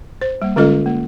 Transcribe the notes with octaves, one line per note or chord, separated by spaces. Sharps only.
C5
G3 A#3
D3 G#3 C#4 F4 A4 D#5
A#3